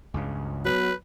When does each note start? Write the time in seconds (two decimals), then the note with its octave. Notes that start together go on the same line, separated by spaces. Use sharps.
0.14 C#2 G2 C#3
0.65 F#3 B3 B4